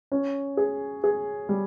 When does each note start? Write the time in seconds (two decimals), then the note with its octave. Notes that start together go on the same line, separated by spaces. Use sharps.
0.12 C#4
0.57 G#4
1.04 G#4
1.49 G3